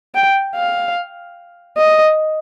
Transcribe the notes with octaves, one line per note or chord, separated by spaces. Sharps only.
G5
F5
D#5